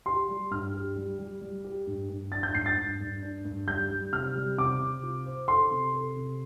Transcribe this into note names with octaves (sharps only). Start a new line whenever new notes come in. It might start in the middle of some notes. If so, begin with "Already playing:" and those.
G4 C6
G3
G2 F6
G4
G3
G3
G3
G4
G2
G2
D4 A6
G6
G2 C7
A6
G2
G2
D4
G2
G3 G6
G3
C3 F6
G3
C3 D6
C3
F4
C5
A4 C6
C3
A4
C3